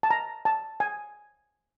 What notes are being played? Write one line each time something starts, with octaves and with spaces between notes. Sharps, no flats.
A5
A#5
A5
G#5